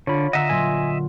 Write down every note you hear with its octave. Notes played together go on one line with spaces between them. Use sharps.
D3 F4 C#5 B5
D3 D#5 E5 F#5 A#5 E6
A#2 F#3 G#5 C6